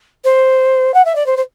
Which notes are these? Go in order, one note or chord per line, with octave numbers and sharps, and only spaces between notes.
C5
F#5
E5
D5
C5
C5